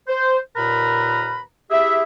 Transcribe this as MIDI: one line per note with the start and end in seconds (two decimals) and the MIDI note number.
0.08 0.38 72
0.56 1.41 39
0.56 1.41 46
0.56 1.41 70
0.56 1.41 71
0.56 1.41 82
0.56 1.41 83
1.71 2.03 64
1.71 2.03 67
1.71 2.03 68
1.71 2.03 76